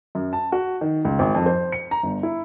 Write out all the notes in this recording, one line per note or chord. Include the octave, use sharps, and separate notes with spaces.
F#2
A5
F#4
D#3
C#2
G#1
F2
C5
C#7
A#5
G1
E4